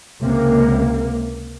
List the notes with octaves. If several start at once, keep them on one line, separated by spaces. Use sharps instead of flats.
C#2 C3 A#3